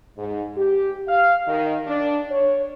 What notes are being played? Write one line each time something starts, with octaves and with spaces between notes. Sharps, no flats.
G#2
G4
F5
D#3
D4
C#5